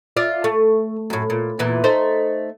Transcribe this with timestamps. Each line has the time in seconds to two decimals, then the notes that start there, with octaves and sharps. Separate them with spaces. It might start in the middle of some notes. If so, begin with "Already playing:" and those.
0.17 F4 D5 E5
0.44 A3
1.10 F#2 A2
1.30 A#2
1.59 E2 A#2 E3
1.84 A3 D#4 C5